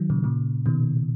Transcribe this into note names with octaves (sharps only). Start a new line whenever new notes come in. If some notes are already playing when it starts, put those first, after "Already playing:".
Already playing: D#3 F#3
A#2 C#3
A#2 C#3
B2 D#3